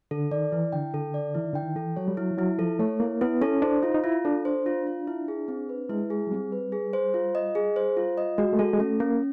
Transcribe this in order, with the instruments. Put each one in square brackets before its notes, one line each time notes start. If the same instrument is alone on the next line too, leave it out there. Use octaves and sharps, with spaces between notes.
[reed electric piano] D3 [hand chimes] A4
[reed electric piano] D#3 [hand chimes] D5
[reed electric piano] E3 [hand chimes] E4
[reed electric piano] D3 [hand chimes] G5
[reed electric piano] D3 [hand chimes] A4
[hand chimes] D5
[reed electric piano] E3 [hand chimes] E4
[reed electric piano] D#3
[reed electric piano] D3 [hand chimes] G5
[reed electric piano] D#3
[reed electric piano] E3 [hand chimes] A4
[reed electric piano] F#3 [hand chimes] C#5
[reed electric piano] G3
[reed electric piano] F#3 [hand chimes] E4
[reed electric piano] F3
[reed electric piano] F#3 [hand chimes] E4
[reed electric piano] F3 [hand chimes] A4
[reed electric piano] A3 [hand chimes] C#5
[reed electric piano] A#3 [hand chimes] E4
[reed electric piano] B3 [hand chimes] E4
[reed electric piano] C#4 [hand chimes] A4
[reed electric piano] D4 [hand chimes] C5
[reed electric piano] D#4 [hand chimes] F4
[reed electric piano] D#4
[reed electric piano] E4 [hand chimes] F4
[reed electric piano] D4 [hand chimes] A4
[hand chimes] C5
F4
F4
E4
G#4
C4
B4
[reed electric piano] G#3 [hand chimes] E4
[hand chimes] G#4
[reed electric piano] F#3
[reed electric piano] G3 [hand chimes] C4
[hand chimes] B4
G#4
C5
F4
D#5
G#4
C5
F4
D#5
[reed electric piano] G#3 [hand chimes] F#4
[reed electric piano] A3
[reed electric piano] G#3 [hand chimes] A4
[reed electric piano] G#3
[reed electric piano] A3 [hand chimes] C#4
[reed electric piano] A#3 [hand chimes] C#4